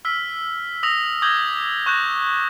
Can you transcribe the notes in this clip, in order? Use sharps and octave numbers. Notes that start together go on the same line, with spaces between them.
E6 F6 B6
D#6 E6 A#6 F7
D6 D#6 G6 G#6 A#6 G7
C#6 F#6 G6 A#6 E7